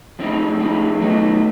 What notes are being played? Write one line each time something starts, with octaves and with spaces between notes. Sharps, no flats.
F3 G#3 A3 C4 D#4
F3 G#3 C4 D#4
D#3 F#3 A3 B3 D#4